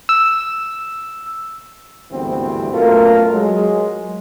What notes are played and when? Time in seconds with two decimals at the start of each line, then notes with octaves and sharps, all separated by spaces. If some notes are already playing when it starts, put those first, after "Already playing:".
0.09 E6
2.12 G#1 D2 G2 E3 B3 C4
2.73 F#2 B2 A3 F4 A#4
3.34 F#3 G#3